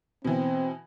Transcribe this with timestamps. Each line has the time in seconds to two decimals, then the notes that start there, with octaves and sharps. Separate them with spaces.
0.25 B2 E3 C4